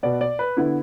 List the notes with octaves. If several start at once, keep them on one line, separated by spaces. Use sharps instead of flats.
B2 B3 D5
D5
B4
D3 B3 E4